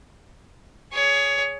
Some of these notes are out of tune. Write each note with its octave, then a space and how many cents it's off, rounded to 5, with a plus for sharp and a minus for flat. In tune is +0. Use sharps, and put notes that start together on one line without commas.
G#4 +0 C#5 +20